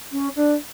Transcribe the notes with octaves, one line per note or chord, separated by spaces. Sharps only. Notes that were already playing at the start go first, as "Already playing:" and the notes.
C#4
D4